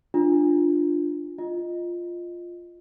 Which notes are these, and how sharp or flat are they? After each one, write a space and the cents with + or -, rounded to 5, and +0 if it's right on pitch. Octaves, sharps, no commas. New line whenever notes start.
D4 +15 F4 +0
F4 +0 D#5 +0